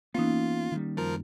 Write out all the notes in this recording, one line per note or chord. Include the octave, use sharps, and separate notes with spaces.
E3 A#3 B3 C#4 D#4 F4
D#3 G3
F#2 F3 A#4